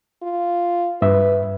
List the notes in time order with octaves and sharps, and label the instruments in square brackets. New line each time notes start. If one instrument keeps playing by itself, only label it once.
[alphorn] F4
[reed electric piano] G2 E5 [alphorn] B4